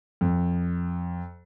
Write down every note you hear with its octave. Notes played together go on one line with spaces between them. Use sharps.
F2